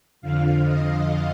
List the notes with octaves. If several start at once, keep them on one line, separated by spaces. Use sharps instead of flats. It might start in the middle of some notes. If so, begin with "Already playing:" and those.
F2 D3 F3 F5
D#5